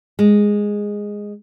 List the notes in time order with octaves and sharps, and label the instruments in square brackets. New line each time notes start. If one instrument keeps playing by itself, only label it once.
[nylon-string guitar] G#3